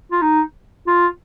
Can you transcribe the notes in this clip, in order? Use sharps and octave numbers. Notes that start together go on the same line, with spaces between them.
F4
D#4
F4